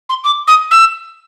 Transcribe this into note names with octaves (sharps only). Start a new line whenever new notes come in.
C6
D6
D#6
E6